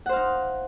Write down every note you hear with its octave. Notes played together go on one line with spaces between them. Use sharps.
D#4 C5 F5 F#5